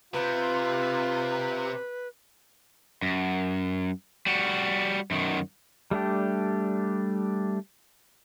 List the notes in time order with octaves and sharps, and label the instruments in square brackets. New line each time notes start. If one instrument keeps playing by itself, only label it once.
[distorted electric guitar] C3 [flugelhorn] F4 [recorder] B4
[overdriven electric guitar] F#2
G3 F#4
F#2 D#3
[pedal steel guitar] G3 A3 D4 G4